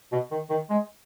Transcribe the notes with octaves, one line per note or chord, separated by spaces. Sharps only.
B2
D#3
D#3
G#3